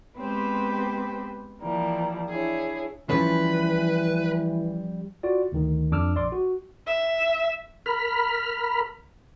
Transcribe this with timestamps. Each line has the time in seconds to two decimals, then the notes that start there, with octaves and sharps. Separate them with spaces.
0.17 G#3 B3 C4 G4 B4 C5
1.61 E3 F3 G3 A#3
2.28 D4 E4 G#4 C#5
3.10 E3 F3 G3 C#4 B4
5.23 F4 F#4 D5
5.52 D2 D#3
5.91 F2 D4 D6 E6 F6
6.15 A#1 D5 C6 D6
6.32 F#4
6.87 E5
7.86 A#4 B5 F6